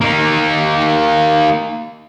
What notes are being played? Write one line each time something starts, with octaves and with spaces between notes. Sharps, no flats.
A#3 D#4